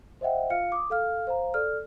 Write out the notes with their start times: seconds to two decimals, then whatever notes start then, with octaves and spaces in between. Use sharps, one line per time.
0.21 C5 D#5 E5 F#5 G5
0.50 F4 F5 F6 C#7
0.72 D6 D#6
0.90 A4 F5 F6
1.27 C5 F5 A#5
1.54 A4 D5 F6